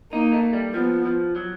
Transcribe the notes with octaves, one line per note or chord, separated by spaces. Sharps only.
A#3 D#4
A3
G3
F3 B3
F3
F#3